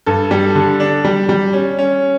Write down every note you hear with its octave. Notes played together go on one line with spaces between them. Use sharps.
G2 A4
G3
D3
D4
G3
G3
C#4
C#4